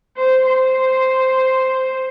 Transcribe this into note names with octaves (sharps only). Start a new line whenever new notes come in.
C5
C5